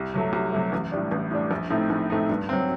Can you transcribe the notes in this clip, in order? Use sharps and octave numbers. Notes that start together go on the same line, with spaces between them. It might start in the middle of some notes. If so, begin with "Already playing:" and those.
Already playing: C2
C3 F#3 A3
C2
C3 F#3 A3
A1
A2 G3 D4
A1
A2 G3 D4
A#1
A2 A3 C4 D#4
A#1
A2 A3 C4 D#4
G2
F#3 C4